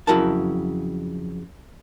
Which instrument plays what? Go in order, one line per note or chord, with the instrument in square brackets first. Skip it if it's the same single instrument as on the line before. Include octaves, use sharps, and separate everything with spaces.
[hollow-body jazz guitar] F2 C#3 F#3 E4 A#4 A5